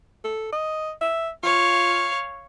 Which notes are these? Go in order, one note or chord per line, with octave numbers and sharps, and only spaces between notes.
A4
D#5
E5
F4 C#5 F5